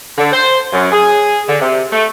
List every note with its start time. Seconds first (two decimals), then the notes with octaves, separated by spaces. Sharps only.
0.17 D3
0.32 C5
0.72 F#2
0.92 G#4
1.48 D3
1.60 C3
1.91 A3